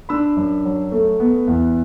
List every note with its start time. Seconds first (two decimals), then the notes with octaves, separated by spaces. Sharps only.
0.09 D4 B5 E6
0.37 F#2
0.65 F#3
0.92 A3
1.20 B3
1.47 E2